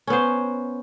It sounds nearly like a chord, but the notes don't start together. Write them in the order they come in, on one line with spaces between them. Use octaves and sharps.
C#4 B3 C5